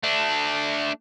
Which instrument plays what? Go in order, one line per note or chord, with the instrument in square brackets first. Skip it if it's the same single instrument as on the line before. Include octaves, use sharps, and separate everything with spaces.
[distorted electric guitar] A3 D4